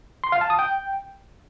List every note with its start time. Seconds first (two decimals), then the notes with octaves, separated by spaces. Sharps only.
0.24 C6
0.32 F5
0.41 A5
0.50 D#6
0.59 G5